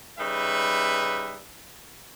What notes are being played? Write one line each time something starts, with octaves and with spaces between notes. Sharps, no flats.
C#3 G3 D#4 B4 E5